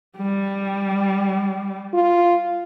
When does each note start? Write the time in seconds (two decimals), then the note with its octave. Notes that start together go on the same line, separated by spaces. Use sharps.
0.17 G3
1.94 F4